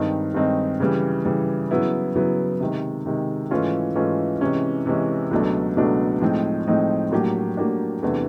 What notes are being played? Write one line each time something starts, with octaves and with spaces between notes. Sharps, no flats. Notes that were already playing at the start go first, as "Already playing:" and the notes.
Already playing: G2 D#3 G#3 C4 D#4
G2 D#3 G#3 C4 D#4
C#3 E3 G3
C#3 E3 G3
C#3 F#3 B3 E4
C#3 F#3 B3 E4
C3 D#3 G#3
C3 D#3 G#3
G#2 E3 A3 C#4 F4
G#2 E3 A3 C#4 F4
C3 E3 G#3 C#4
C3 E3 G#3 C#4
C#2 B2 F#3 A3 D4
C#2 B2 F#3 A3 D4
A2 F3 G#3 C4 D#4
A2 F3 G#3 C4 D#4
A2 F#3 A#3 D4 G4
A2 F#3 A#3 D4 G4
E2 C3 E3 A3 D4